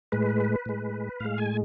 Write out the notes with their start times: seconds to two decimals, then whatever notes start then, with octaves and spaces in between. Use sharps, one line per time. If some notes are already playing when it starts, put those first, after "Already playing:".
0.12 A2 G#3 B4
0.66 A2 G#3
1.20 A2 G#3 F5
1.38 G#5